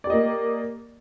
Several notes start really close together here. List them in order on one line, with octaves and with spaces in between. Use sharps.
D5 G4 D#5 A#3